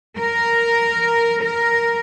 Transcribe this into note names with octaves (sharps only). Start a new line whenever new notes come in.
A#4
A#4